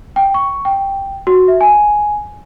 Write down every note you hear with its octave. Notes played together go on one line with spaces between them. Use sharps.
G5
C#6
G5
F#4
E5
G#5